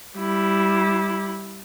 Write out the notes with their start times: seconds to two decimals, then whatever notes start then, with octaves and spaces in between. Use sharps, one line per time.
0.17 G3 E4